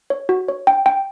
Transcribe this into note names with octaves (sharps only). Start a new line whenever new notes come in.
C#5
F#4
C#5
G5
G5